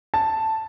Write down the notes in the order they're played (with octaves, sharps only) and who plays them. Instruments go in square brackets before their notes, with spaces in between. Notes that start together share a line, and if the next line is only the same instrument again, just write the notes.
[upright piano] A5